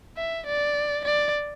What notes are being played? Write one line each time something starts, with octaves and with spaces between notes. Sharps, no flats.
E5
D5
D5